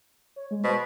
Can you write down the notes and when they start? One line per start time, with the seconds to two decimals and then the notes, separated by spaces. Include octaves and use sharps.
0.36 C#5
0.51 G#3
0.64 B2 C5